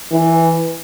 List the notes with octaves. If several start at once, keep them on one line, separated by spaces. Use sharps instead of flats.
E3